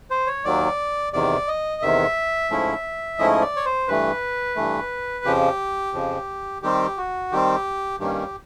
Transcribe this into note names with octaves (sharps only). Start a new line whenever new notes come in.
C5
C#5
D#2 D#3 F#3 D5
E2 C3 D#3 D5
D#5
E2 C3 D#3 E5
G#2 F3 A3 C#4 E4
G#2 F3 A3 C#4 E4 D#5
D5
C#5
C5
G2 E3 A3 B4
G2 E3 A3
F2 C#3 F3 G4
F2 C#3 F3
D#3 G3 C4 G4
F#4
D#3 G3 C4 G4
G2 D#3 G3 A#3 C#4 G4